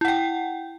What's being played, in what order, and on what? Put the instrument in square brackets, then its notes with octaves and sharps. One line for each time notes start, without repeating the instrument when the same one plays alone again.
[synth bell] E4
F#5
G5